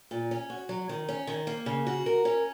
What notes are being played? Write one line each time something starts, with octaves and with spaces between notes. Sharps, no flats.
A#2
C#4
F#4
F#3
D#3
C#4
D#3
A#3
C#3
F#4
A#4
C#4